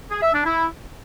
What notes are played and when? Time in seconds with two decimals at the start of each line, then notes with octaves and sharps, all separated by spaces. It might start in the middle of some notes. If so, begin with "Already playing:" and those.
0.10 G#4
0.22 E5
0.34 D4
0.45 E4